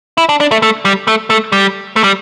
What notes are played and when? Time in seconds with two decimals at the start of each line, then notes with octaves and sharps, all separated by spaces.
0.18 E4
0.29 D4
0.40 D4
0.51 A3
0.62 A3
0.85 G3
1.07 A3
1.30 A3
1.52 G3
1.96 A3
2.04 G3